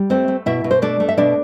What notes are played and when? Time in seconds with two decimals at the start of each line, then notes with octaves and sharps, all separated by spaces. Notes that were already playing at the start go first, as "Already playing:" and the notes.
Already playing: G3
0.10 A3 C4 C5
0.28 A3
0.46 B2 E4 E5
0.64 B2
0.71 C5
0.82 A3 D4 D5
1.00 A3
1.09 E5
1.17 B2 D4 D5